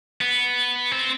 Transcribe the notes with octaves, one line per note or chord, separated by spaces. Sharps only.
B3
C4